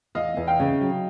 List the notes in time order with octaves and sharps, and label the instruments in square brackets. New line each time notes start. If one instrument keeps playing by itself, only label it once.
[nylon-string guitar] E2 [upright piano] D#5 F5
[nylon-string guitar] E2
[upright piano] F5 G5
[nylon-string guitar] C#3
F#3